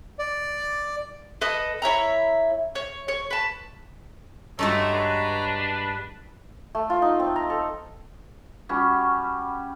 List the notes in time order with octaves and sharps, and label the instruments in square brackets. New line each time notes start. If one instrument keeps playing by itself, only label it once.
[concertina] D5
[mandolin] A4 B4 D#5 D#6
E4 C#5 E5 A#5
C#5
C#5
B4 A5
[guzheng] G2 G#3 F#4 [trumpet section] A3 [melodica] C#5 A#5
[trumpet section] D4 B4
[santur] A3
F4
D#4
C4
A#5
A4
[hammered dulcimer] G3 C#4 F#4